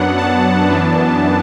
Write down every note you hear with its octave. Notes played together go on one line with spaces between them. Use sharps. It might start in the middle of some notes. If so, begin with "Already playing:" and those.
Already playing: F#2 F#3 B3 D4 F#5
A5
F#2 E3 B3 D4